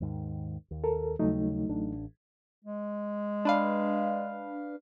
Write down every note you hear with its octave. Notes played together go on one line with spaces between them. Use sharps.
D#2 G#2 D#3
D#2
A4 A#4
D#2 C#3 F#3 G3 A3 D#4
A1 D4
G#3
D4 B4 F5